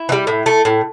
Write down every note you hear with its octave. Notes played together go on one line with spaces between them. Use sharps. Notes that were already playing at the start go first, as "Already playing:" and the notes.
Already playing: E4
E3
G3
A2
A3
A2